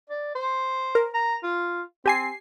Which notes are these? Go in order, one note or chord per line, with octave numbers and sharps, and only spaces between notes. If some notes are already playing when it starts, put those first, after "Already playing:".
D5
C5
A#4
A#5
F4
C4 G4 G#5 C7